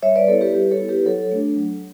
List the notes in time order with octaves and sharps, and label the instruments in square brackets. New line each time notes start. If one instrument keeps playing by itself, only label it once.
[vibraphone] G3 C#5 E5
B4 D5
B3 A4 C#5
E4
G4 B4
G3 G4 B4
A4 C#5
B3 E4
G4 B4
F#3 A4 C#5
A3 D4
F#3